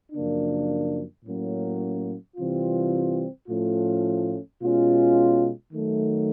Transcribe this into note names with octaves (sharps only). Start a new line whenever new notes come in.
F#2 C#3 F3 A#3 D4
A2 F#3 A#3 C#4
C3 E3 G3 C4 F4
A2 F3 A3 C#4 F4
B2 G#3 C#4 F4
D#3 F#3 A3